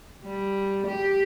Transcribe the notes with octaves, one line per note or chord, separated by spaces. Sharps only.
G3
G4